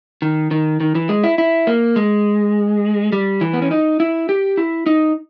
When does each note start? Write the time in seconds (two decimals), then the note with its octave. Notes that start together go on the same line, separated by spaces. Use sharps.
0.22 D#3
0.51 D#3
0.80 D#3
0.95 E3
1.09 G#3
1.24 E4
1.38 E4
1.67 A#3
1.96 G#3
3.12 G3
3.41 E3
3.53 B3
3.62 C#4
3.71 D#4
4.00 E4
4.29 G4
4.57 E4
4.86 D#4